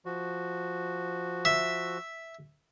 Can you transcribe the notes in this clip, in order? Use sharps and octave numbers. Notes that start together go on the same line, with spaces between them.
F3 F#4
E5